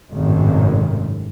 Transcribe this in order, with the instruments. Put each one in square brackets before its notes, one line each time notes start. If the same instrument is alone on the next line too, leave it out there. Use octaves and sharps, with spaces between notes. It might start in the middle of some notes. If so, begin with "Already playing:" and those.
[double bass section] G#1 F#2 A2 C3 D#3